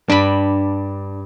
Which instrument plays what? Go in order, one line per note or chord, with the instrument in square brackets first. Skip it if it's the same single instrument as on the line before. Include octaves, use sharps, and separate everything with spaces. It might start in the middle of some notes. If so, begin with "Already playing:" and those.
[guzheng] G2 B5 [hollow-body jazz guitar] D4